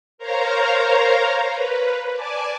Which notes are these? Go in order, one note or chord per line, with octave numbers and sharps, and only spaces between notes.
A#4 C5 C#5 F5 A#5
B4
D5 G#5 A5 D6